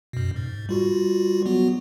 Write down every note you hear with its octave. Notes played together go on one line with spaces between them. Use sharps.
F#2 B2
G#2
G3 F4 F#4
F#3 B3 F#4